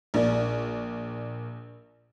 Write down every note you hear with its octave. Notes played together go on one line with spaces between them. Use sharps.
A#1 A#3 D5